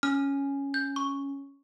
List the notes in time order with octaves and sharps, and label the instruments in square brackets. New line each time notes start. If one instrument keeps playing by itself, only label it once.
[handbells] C#4 [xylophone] F6
[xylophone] G6
C#6